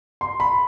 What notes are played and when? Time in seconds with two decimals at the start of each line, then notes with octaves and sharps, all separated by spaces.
0.21 C6
0.40 B5